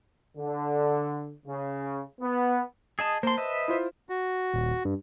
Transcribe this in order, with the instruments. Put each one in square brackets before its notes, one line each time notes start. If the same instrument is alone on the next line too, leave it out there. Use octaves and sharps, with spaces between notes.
[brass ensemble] D3
C#3
B3
[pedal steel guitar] G#4 D#5 A5
[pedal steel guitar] A#3 C6 [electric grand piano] C5 A5
[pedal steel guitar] B4 D#5 E5
[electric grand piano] E4 F4 C5
[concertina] F#4
[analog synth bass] D#1
G2